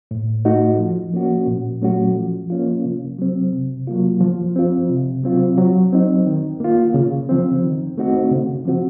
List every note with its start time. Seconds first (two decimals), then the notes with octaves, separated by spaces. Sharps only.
0.11 A2
0.45 A3 D#4 F#4
0.78 F3
1.14 A#3 C#4 F#4
1.47 A#2
1.82 F#3 A3 C#4 F#4
2.16 F3
2.50 A#3 C#4 F4
2.85 C3
3.18 F#3 C4
3.53 C3
3.87 F#3 A#3 F4
4.21 F3
4.56 C4 F4
4.89 C3
5.23 F#3 C4 F4
5.57 F#3
5.93 C4 D#4
6.27 D#3
6.60 A#3 F4
6.94 C#3
7.29 F3 C4
7.64 D#3
7.98 A3 C4 D#4 F#4
8.31 C#3
8.65 F3 C4 F#4